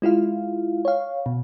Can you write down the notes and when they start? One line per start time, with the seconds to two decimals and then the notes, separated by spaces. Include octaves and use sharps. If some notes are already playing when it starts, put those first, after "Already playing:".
0.02 G#3 E4 F4 F5
0.85 C#5 F5
1.26 B2